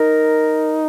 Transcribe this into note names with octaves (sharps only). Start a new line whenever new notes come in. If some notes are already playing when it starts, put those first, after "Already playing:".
Already playing: D#4 A#4